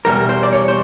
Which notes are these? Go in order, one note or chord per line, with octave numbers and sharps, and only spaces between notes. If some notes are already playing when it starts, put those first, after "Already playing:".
E2 B2 G3 A#4
C5
D5
C#5
C5